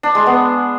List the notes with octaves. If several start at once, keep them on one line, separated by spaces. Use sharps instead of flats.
D4
G#3
B3